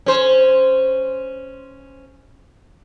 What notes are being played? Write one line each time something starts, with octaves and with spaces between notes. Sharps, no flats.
C#4 C5